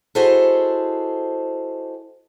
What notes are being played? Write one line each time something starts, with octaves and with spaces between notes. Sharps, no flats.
E4 F#4 G#4 A4 C5 D#5